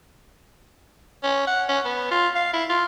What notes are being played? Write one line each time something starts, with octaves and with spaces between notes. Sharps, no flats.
C#4
F#5
C#4
B3
F4
F5
E4
F4